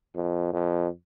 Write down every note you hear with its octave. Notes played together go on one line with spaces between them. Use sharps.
F2
F2